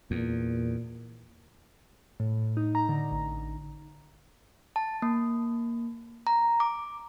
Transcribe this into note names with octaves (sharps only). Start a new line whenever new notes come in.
E2 A#2
A2
D#4
A#5
D3
A1
A5
A#3
A#5
D6